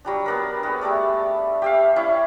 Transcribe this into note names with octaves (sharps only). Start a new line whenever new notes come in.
F#3 G3 D4
B3 D4 A#4
B3 G#4
G3 A3 A4 D5
G4 E5 F5
C#4 E4 D5